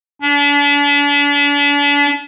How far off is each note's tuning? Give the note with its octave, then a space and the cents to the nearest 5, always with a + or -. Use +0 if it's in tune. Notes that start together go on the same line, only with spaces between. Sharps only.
D4 -40